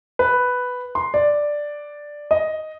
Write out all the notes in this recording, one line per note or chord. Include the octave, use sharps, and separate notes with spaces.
B4
C6
D5
D#5